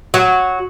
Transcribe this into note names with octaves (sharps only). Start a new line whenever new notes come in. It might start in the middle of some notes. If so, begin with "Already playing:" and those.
F#3